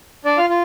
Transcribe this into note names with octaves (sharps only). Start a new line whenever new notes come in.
D4 D5
F4 F5
F4